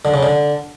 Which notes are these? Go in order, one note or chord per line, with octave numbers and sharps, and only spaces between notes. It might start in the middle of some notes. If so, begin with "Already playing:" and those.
D3
C#3
D3